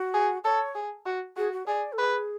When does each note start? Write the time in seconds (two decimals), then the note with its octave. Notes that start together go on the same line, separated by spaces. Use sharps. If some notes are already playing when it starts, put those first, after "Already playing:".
Already playing: F#4
0.14 G#4
0.44 A4 C#5
0.75 G#4
1.06 F#4
1.37 F#4 G#4
1.52 F#4
1.67 G#4 D5
1.93 A4
1.98 G#4 B4